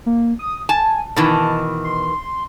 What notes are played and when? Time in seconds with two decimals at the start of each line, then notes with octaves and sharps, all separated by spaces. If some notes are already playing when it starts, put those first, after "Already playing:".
0.06 A#3
0.39 D#6
0.69 G#5 A5
1.16 B2 D#3 E3 A5
1.84 C6